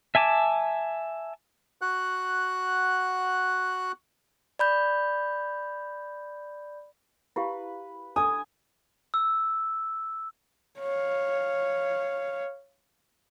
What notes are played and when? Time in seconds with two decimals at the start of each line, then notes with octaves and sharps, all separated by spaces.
0.15 E5 G#5 A5 D6
1.81 F#4 F#5 F#6
4.59 D5 B5 G6
7.36 E4 G4 B4 F5
8.16 D4 A4 G#5 D#6
9.14 E6
10.79 C#5 F5